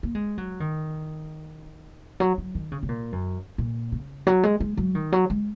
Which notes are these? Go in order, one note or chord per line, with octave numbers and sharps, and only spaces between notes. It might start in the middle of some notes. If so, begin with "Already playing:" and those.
A#3
G#3
F#3
D#3
F#3
F#3
D#3
C#3
C#3
A#2
F#2
A#2
C#3
F#3
G#3
G#3
F#3
D#3
F#3
G#3